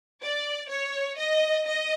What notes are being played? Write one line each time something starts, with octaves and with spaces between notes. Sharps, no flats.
D5
C#5
D#5
D#5